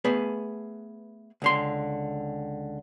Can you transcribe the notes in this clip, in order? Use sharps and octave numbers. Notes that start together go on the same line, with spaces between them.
A3 B3 G#4 B4
C#2 D3 C6